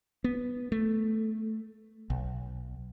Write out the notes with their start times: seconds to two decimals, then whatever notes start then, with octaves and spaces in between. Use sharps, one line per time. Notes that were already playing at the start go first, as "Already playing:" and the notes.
0.24 B3
0.72 A3
2.10 B1